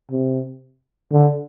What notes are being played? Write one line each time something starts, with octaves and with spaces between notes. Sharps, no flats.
C3
D3